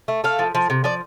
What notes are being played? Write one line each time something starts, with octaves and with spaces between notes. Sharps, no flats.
A3
A3 F5
F3
F3
C3
F3 D5